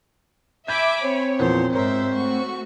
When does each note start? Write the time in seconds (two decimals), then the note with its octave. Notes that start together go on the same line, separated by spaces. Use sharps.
0.68 E5 G#5 B5 D6 G6
1.03 C4 C#5
1.39 E2 A#2 F3 C5
1.73 G#2 A#4 C5 C#5 E5
2.15 A3 F#4 C#6